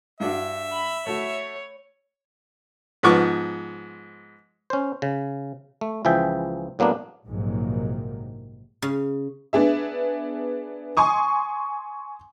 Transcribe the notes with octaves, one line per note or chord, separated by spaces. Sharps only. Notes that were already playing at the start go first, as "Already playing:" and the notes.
G2 D4 F#4 E5
B5
A3 F#4 C#5
G#2 F3 B3 C#6 D6
C#4 C5
C#3
A3
C#2 E3 F3 G#4 E5 G5
A2 F#3 A#3 B3 D4
A#1 G#2 C3 D#3 F#3 A#3
C#3
B3 D4 G#4 E5
G#5 C6 C#6 D#6